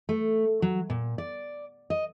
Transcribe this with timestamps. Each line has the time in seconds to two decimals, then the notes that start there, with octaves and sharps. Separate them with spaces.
0.09 A3
0.62 F#3
0.90 A#2
1.18 D5
1.90 D#5